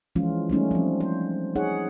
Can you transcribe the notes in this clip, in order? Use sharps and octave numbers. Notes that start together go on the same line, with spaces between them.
E3 F3 G#3 C#4 F4
G3 A3 C#4 D#4
F3 C4
C5
D#4 G#4 C#5 F#5